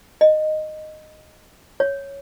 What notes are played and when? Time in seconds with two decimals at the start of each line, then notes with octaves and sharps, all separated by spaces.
0.21 D#5
1.80 C#5